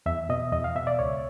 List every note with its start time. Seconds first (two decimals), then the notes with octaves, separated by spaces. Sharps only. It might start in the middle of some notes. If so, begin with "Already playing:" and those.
0.06 E2 E5
0.29 B2 D#5
0.52 E2 D#5
0.64 F5
0.76 B2 E5
0.87 D5
0.99 C#2 C#5